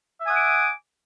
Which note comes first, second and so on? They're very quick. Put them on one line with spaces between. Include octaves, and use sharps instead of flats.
E5 G#5 D#6 F#5 D6